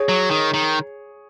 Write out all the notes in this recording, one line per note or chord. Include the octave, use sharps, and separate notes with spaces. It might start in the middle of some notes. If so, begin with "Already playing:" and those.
Already playing: G#4 C#5
F#3
D#3
D#3